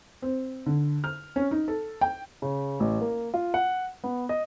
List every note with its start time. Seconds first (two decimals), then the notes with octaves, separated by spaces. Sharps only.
0.22 C4
0.66 D3
1.04 F6
1.36 C#4
1.51 D#4
1.68 A4
2.01 G5
2.42 C#3
2.80 A1
3.01 A#3
3.34 F4
3.54 F#5
4.04 B3
4.29 D#5